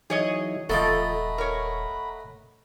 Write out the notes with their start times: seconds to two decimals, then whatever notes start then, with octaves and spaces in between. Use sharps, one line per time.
0.10 E3 F#3 D#4 G#4 C#5 D#5
0.69 D#1 F3 A3 A4 D#5 F#5 A#5 B5
1.38 A#4 C#5